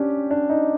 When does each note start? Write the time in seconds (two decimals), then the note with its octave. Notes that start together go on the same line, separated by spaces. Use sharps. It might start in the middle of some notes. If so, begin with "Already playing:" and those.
Already playing: C#4 D4 G4
0.31 D4
0.50 D#4